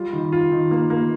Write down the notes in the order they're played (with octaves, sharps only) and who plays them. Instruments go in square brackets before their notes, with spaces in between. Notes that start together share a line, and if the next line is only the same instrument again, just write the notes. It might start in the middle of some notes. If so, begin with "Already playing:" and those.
Already playing: [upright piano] G3 F4
D#3
F4
D#3
A#3
A#3